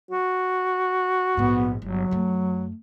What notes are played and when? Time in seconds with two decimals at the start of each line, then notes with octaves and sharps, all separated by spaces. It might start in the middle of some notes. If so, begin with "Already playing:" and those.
0.11 F#4
1.37 A#1 G#2 B3
1.82 G1 F#3
2.11 F#2 A3